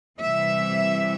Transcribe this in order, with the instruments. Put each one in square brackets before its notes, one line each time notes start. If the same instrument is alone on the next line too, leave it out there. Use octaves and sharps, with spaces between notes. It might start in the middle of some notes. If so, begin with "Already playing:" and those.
[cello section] C3 E3 G3 E5